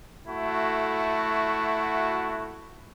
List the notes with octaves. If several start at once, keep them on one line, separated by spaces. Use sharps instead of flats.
A3 E4 F#4